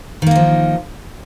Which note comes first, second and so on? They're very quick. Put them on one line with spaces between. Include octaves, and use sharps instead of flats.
D#3 A#3 D#4 F3